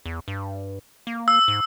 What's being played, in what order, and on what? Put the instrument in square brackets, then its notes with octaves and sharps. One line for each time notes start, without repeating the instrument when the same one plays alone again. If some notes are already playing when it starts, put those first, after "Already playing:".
[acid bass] E2
G2
A#3
[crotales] E6
[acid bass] G#2